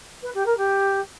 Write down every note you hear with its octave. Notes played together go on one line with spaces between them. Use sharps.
B4
G4
A#4
G4